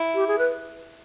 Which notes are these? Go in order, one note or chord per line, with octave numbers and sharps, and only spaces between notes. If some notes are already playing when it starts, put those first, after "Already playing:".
Already playing: E4
G4
G#4
B4